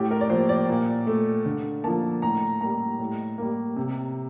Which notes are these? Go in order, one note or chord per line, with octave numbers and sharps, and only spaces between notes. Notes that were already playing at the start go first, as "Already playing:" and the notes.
Already playing: A2 G4
A#4
D5
F3 A#3 C5
D5
A#2
A3
D3
F3 A#3 A5
A2 A#5
G3 A#3 A#5
A2
G3 A#3
C3